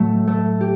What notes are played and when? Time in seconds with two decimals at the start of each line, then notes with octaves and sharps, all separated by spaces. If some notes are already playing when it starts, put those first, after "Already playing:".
Already playing: A2 F#3 A3
0.27 A3
0.61 G4